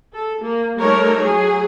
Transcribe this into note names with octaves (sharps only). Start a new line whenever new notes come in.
A4
A#3
G3 A3 D#4 A#4 C#5
F#3 G#4